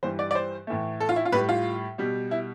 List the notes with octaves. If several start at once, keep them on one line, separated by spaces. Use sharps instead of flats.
G2 E3 G3 C5
D5
D5
C5
A2 E3 A3
A4
F4
E4
F4
A2 G3 B4
F4
B2 G3
E4